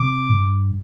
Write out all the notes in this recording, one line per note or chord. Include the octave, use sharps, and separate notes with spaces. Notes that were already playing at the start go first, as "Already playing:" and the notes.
Already playing: C3 D6
G#2
G2